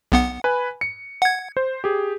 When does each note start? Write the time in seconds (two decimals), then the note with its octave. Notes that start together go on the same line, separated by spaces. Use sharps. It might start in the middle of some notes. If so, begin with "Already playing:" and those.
0.12 B1 B3 F#5
0.44 B4 G#5 B5
0.81 C#7
1.22 F#5 G#6
1.57 C5
1.84 G4 G#4